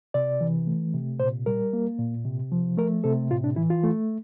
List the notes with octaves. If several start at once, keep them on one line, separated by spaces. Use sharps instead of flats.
C3 D5
E3
A3
C3
A#2 C5
G3 A#4
A#3
A#2
C3
F3
A3 A#4
C3 A4
A2 F4
D4
E3 E4
F4
A3